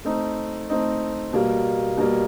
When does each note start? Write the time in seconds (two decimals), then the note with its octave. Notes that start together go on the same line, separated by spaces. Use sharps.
0.05 A3 C4 D#4
0.69 A3 C4 D#4
1.33 B2 G3 A#3
1.97 B2 G3 A#3